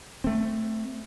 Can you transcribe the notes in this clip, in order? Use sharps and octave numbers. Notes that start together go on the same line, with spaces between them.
A3 C4